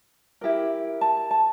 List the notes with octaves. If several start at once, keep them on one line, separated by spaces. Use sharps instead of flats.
E4 G4 A#4
A5
A5